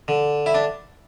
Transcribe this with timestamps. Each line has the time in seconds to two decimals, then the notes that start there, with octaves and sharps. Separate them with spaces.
0.08 D3
0.46 E4
0.54 D4